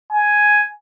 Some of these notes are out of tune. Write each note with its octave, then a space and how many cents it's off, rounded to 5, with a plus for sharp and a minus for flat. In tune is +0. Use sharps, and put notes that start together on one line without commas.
G#5 +5